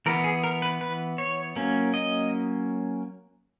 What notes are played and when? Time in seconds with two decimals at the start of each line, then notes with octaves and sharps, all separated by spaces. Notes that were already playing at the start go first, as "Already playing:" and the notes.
0.06 E3 B3 A#4
0.24 G#4
0.44 A#4
0.62 B4
0.81 B4
1.18 C#5
1.56 F#3 A#3 C#4
1.94 D#5